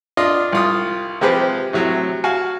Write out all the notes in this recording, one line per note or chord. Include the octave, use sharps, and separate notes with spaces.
D4 F4 D#5
C2 F4 D#6
C3 F3 G#3 G4 B4 C5
A2 C3 F#3
F#4 F5 G#5